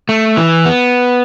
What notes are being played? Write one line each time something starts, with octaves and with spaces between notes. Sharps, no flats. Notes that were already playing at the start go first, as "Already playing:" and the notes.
A3
E3
B3